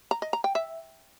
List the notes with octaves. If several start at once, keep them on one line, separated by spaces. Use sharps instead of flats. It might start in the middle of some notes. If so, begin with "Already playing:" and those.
A#5
D#5
A#5
G5
E5